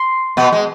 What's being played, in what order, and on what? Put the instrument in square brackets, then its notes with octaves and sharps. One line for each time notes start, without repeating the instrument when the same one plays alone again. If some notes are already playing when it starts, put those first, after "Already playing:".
Already playing: [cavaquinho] C6
[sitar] B2 B3
G#3